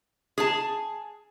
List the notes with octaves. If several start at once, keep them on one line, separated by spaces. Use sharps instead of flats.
G#4 A5